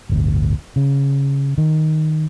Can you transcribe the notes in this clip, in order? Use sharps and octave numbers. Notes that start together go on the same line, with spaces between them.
D1 G1 D2
C#3
D#3